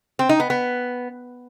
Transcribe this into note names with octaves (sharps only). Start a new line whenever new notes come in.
C4
D#4
B3
B3